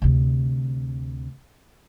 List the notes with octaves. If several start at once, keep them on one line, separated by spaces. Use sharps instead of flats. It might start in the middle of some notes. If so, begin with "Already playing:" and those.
D2 C3